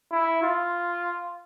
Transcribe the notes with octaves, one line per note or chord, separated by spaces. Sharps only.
E4
F4